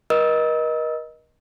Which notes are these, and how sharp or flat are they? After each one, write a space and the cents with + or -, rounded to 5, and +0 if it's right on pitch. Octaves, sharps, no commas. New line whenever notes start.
A#4 +40 D#5 +0 E6 -35